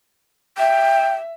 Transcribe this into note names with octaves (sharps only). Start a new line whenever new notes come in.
E5 G5